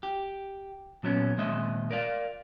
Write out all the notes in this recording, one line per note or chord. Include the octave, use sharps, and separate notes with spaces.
G4
A#2 F#3 B3 C#4
D#2 A#2 G#3 C4 D#5 E5
A#4 D5 F5